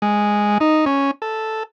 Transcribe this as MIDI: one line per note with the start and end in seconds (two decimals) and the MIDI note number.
0.02 0.58 56
0.60 0.85 63
0.86 1.11 61
1.22 1.63 69